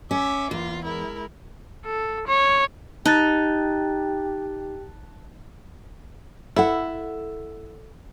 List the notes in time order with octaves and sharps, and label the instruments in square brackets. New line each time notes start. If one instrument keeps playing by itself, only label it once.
[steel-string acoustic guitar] C#4 [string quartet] E5 D6
[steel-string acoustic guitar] E2 [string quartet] A#3 F4
[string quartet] G#3 E4 A#4
[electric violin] A4
C#5
[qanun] D#4 [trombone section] G4 [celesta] A5 F#6 A6
[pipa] E4 [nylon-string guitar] A4 F#5